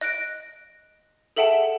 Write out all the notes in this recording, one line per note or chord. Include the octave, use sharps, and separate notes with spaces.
D#5 F#6 A#6 D7
G#4 A4 E5 F#5 G5 A5